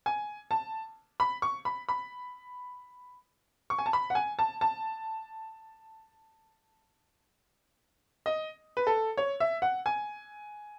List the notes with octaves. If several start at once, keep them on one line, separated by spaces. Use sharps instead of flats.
G#5
A5
B5
C#6
B5
B5
C#6
G#5
A5
B5
F#5
G#5
A5
A5
D#5
B4
A4
C#5
E5
F#5
G#5